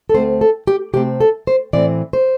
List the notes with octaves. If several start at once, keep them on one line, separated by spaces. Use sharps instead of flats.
A4
D2 C3 A3 C4 C5
A4
G4
C3 A3 C4 G4
A4
C5
A2 E3 C4 D5
C5